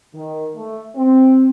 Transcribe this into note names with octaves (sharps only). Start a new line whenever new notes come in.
D#3
A3
C4